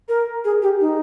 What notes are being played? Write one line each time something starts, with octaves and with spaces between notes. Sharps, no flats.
A#4
G#4
G4
D#4